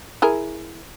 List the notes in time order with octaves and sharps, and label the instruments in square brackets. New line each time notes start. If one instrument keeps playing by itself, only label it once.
[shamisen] E4 G#4 A#4